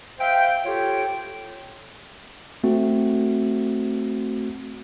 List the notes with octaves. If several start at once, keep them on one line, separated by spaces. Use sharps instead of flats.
C5 E5 F5 G5
F4 G4 A4 C#5 G5
A3 C4 F#4